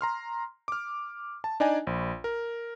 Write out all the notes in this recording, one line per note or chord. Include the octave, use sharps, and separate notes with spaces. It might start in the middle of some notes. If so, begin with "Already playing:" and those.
A#5 C6 F6
D6 F6
A5
D4 D#4 D5 D#5 G#5
A#1
A#4